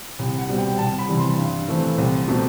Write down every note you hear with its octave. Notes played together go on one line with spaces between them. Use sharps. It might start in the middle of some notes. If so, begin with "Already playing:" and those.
C2
F#5
B2 G3 C4
G5
C2 A5
B5
C3 E3 G3
C6
G2
E3 A3 C4
C2
B2 A3 C4